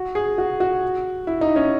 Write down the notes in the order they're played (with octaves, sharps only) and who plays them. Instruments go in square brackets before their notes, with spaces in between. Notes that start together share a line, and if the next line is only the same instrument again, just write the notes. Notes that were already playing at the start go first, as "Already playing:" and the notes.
Already playing: [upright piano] F#4
G#4
F#4
F#4
E4
D#4
C#4